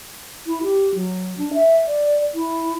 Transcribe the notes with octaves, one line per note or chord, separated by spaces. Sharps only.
E4
G4
F#3
D4
E5
D5
E4